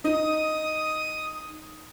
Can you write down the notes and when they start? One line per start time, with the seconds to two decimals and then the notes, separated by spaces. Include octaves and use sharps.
0.04 D#4 D#6